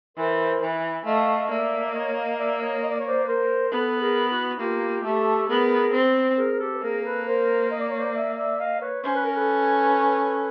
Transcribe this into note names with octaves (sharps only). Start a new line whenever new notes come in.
E3 A#4 C5
E3
A3 D#5 F5
A#3 D5 E5
D5
C#5 D#5
D#5 F5
D5 E5
D5
C#5 D#5
D#5
D5
C#5
C5 D5
B4
A#4 C5
B3 A4 B4
G#4 A#4
E4 F#4
A#3 F4 G4
A3 G4 A4
B3 G#4 A#4
C4
G#4 A#4
G4 A4
B4
A#3 G#4 A#4
A4 B4
A#4 C5
D#5
D5
C#5
C5 D5
D5 E5
D5 E5
D#5 F5
B4 C#5
C#4 C5
B4
A#4
A4 B4